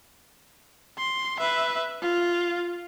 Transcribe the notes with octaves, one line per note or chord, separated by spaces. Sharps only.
C6
B4 E5
F4